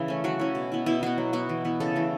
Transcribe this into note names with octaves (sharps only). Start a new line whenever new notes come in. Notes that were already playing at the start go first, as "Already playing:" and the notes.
Already playing: C#3 E3 E4
A3 C#4
F#3 F#4
C#4 E4
B2
B3 E4
B2 E4
B3 E4 F#4
F#3
B3 E4 F#4
E3
B3 E4
C#3 A4
E3 A3